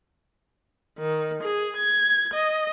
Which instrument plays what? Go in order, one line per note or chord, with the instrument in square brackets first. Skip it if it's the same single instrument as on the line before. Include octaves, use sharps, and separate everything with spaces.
[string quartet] D#3
G#4
G#6
D#5